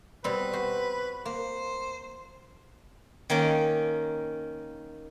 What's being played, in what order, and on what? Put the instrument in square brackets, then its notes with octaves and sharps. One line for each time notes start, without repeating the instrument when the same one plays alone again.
[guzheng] B2 G3 C4 [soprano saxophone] B4
[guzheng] F#4 C5
[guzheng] A#3 [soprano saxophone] C5
[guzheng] D#3 A#3 C#4